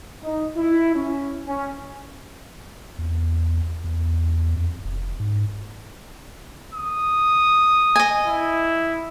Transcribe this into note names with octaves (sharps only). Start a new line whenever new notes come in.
D#4
E4
C#4
C#4
E2
E2
F2
F1
G#2
D#6
D#5 G#5
E4